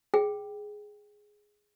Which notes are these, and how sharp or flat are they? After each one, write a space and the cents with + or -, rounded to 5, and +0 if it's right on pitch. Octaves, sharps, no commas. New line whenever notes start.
G#4 +0 G5 +0